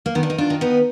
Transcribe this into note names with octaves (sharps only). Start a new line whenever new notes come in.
A#3
D#3 B3
D4
D#4
D4 F4
D#3
B3 D#4